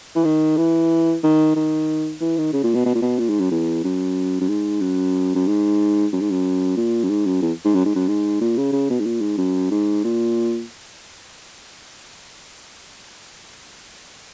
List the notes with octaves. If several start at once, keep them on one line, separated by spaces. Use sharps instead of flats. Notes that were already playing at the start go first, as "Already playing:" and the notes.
E3
D#3
E3
D#3
D#3
E3
D#3
C#3
A#2
B2
B2
A#2
B2
A#2
G#2
F#2
E2
F#2
F#2
G#2
F#2
F#2
G#2
F#2
G#2
F#2
A#2
F#2
G#2
F#2
E2
G#2
F#2
G#2
F#2
G#2
A#2
C#3
C#3
B2
G#2
A#2
G#2
F#2
G#2
A#2